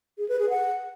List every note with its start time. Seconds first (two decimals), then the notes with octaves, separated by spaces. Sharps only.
0.18 G#4
0.29 B4
0.39 G#4
0.50 F#5